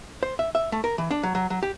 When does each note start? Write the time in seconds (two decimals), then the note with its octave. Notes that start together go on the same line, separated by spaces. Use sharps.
0.23 C5
0.39 E5
0.55 E5
0.72 A3
0.84 A#4
0.98 E3
1.11 D4
1.23 F#3
1.35 F#3
1.50 F#3
1.63 G4